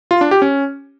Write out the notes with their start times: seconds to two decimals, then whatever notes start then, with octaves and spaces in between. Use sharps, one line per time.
0.11 F4
0.21 D4
0.31 G4
0.42 C#4